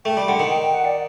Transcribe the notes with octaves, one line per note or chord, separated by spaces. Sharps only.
A3 G5
G3
D3 F#5
D#3
G5
G5
F#5
D5